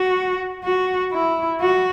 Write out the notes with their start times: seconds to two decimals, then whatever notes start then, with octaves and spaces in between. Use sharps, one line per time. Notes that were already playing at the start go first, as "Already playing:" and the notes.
Already playing: F#4
0.64 F#4
1.13 E4
1.61 F#4